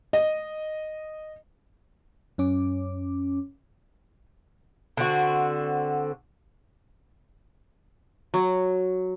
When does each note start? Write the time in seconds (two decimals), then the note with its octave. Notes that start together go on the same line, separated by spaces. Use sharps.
0.13 D#5
2.38 F#2 C#4 D6
4.97 D3 C4 F#4
8.34 F#3